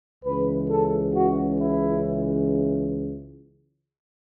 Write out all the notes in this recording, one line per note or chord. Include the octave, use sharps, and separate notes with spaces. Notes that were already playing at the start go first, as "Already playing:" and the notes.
C#2 C#3 E3 B4
A4
F#4
E4